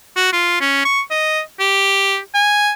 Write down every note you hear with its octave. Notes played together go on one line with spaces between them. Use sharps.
F#4
F4
C#4
C#6
D#5
G4
G#5